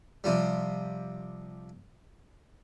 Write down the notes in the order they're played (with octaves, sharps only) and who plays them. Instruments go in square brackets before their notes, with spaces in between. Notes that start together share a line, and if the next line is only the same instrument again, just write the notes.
[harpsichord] C3 F3 G3